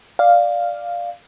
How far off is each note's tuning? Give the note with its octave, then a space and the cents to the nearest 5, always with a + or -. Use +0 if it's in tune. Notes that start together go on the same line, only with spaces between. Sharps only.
D5 +5 F5 +0